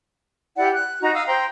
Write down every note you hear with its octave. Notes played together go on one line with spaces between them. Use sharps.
E4 G4 D5 F#5
F#6
D#4 F#4 A#5
F5 D#6 E6
C5 G5 A#5 C6